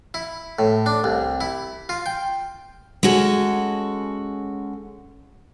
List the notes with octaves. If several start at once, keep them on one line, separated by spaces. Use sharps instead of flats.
E4
A2
D4
C2
E4
F4
G5
G#3 C#4 F#4 A4